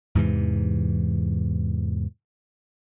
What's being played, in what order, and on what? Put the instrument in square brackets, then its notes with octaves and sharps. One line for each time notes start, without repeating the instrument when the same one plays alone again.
[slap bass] E2 G#2 C3 E3